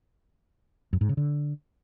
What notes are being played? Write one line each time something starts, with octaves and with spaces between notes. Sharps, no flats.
F#2
G#2
C#3
D3